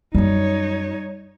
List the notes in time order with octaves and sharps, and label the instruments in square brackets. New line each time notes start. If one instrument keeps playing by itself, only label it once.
[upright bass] F#2 F#3 [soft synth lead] G3 [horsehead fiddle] D#4 C#5